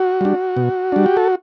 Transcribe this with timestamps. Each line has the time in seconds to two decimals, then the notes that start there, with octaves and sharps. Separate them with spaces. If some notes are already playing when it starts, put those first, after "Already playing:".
Already playing: F#4
0.21 G3 D4
0.57 B2
0.92 G3 D4
1.06 G4
1.17 A4